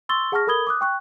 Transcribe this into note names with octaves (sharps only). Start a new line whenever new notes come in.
C6 C#6 E6 A6 G7
G#4 F#5 A5 C#6 F6 A#6
A4 A#4 B5 D#6 G#6 G7
D6 D#6 F#6
G5 C#6 F#6